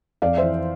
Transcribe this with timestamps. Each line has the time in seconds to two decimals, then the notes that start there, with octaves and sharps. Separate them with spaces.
0.22 F2 D5 F5
0.37 E3 C5 E5